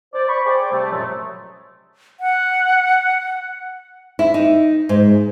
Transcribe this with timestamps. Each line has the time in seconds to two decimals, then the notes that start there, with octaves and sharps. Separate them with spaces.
0.14 C5 D5
0.29 D5 B5 C#6
0.46 G#4 C5 D5 G5
0.72 C3 G3 A3
0.91 F#2 A#2 F3 F#3 G#3 A3
2.20 F#5
4.19 E4
4.34 D#4
4.89 G#2